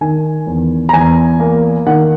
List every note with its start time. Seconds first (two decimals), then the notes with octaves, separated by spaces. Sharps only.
0.01 D#3 G#5
0.47 E2
0.89 A#5
0.93 E2 G#5
1.40 A#3
1.86 D#3 F#5